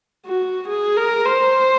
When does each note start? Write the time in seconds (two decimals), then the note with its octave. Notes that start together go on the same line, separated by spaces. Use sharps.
0.26 F#4
0.68 G#4
0.97 A#4
1.26 C5